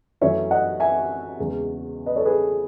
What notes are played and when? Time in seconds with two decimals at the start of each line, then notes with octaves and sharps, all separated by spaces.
0.21 F#2 E3 A3 C#4 C#5 E5
0.51 D#5 F#5
0.80 E5 G#5
1.38 E2 C#3 G#3 C#4
2.06 B4 D#5
2.16 A4 C#5
2.25 G#4 B4